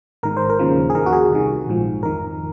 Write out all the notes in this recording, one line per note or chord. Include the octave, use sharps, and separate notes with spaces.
G#1 G#2 D#3 A#4
C5
A#4
D#2 C#3 F3
G#4
D#2 D#3 A#4
F#4
G#4
C2 C3 D#3
A#1 G#2 F3
F2 D#3 A#4